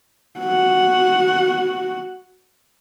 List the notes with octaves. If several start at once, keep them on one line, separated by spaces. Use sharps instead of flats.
F#4 F#5